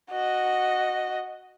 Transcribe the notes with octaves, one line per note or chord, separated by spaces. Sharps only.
F#4 D#5